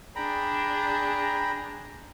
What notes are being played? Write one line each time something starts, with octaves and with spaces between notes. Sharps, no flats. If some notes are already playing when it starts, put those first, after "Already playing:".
D4 G#4 G5 A#5 B5